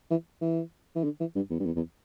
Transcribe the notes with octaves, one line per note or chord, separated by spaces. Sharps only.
E3
E3
E3
D3
E3
G2
E2
G2
E2
E2